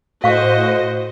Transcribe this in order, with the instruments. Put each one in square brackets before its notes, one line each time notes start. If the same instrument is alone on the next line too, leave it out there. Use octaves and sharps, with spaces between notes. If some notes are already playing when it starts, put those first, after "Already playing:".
[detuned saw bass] A2 [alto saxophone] F#4 [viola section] C5 D#5 [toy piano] F5 C#6